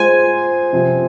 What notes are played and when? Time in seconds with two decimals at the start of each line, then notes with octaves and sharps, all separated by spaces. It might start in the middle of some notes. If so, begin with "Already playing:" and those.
Already playing: G#3 F4 G#4 C5 G#5
0.73 C3 F3 C4